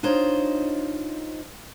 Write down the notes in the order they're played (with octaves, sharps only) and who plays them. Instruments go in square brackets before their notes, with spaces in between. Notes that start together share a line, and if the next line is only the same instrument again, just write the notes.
[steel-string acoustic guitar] D4 D#4 F4 C5 C#5 D#5